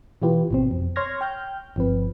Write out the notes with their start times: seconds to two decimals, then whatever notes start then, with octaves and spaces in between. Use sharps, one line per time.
0.22 B2 E3 F4 G4 B4
0.51 G#1 B2 C4
0.71 F2
0.96 C#5 C6 C#6 F6 G#6 A#6
1.21 G5 F6 G6
1.76 G1 F3 C4 B4